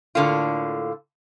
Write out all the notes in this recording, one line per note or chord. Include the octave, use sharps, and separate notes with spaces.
A2 D3 A#3 F4